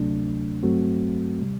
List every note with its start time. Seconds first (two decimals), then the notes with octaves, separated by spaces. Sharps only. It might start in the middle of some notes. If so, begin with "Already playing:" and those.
Already playing: D2 C3 F#3 A3 D4
0.63 G2 F#3 A3 C4 F#4
1.41 C3 G3